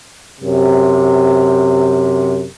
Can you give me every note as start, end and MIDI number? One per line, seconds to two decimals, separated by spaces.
0.42 2.45 42
0.42 2.45 48